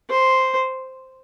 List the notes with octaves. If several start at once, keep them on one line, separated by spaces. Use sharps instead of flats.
C5